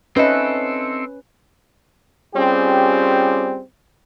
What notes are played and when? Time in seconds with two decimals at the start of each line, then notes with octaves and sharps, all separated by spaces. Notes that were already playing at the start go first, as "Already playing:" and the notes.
0.16 C4 C#4 D#4 A4 B4 D#5 E5
2.35 G3 C4 C#4 F4 G4 G#4